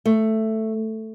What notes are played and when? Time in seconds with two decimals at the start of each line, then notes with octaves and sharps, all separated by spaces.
0.05 A3